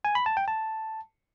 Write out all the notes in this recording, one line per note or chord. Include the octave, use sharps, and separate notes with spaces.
G#5
B5
A5
G5
A5